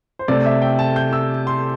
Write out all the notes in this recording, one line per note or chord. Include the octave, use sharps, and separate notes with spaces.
C5
C3 A3 D5
E5
G5
A5
G6
E6
C6